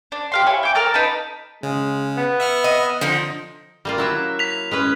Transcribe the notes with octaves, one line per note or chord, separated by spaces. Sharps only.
D4
G4 F5 C6
E4 C#5 G#5
G5 D6
A4 A#4 D6 F6
D#4 B4 A5
C#3 G#3
B3
E5 F#5 F6
D#5
D3 F3 D#4
G3 A#3 F4
F#3 E4 E5
B6 F7
G#3 C#4 B4